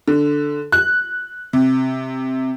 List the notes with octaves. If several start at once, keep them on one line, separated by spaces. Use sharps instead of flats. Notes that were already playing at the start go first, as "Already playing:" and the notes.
D3
F#6
C3